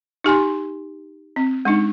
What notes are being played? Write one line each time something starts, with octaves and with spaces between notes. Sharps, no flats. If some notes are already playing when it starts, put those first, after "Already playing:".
D#4 G4 G#5 C6
C4
G#3 D4 D#4